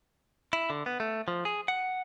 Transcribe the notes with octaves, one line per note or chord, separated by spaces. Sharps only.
E4
D3
B3
A3
F3
G#4
F#5